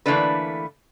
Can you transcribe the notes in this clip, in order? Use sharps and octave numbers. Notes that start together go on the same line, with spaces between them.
D3 E3 A3 A#3 D4 B4